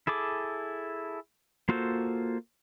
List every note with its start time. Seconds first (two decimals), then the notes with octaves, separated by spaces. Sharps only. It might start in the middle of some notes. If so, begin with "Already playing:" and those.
0.07 E4 G#4 A4 D6
1.69 A#3 F4 F#4 A4 C5